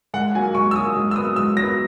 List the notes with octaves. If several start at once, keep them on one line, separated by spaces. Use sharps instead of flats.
G#2 F#5
F#3 A#3 G#5
G#2 C#6
E6
F#3 A#3 D#6
G#2
E6
F#3 B3 D#6
G#2 E6
F#3 A#6
B3